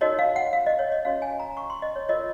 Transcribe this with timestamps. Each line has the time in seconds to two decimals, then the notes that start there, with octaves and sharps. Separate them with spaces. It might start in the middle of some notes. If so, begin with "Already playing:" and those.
0.01 D#4 F#4 A#4 C#5 D#5
0.19 F5
0.36 F#5
0.53 F5
0.66 D#5
0.79 C#5
0.92 D#5
1.05 C#4 F#4 C#5 F5
1.22 G#5
1.40 A#5
1.57 C#6
1.70 C6
1.82 D#5
1.96 C#5
2.08 F4 A#4 C#5 D#5